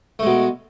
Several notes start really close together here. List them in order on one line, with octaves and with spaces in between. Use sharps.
A3 G#3 B2